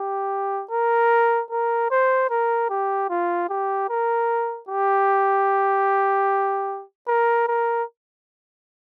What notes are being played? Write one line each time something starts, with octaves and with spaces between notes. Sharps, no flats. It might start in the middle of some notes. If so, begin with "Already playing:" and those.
Already playing: G4
A#4
A#4
C5
A#4
G4
F4
G4
A#4
G4
A#4
A#4